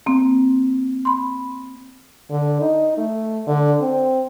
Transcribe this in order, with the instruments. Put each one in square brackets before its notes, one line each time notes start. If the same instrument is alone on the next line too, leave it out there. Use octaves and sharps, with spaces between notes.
[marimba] A#3 C4
B5 C6
[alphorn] D3
D#4
A3
D3
C4